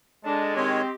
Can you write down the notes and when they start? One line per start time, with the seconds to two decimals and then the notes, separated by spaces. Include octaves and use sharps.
0.25 G#3 D4 A4 D#5 A5
0.56 D#3 C4 G4 C#5 D#5 C6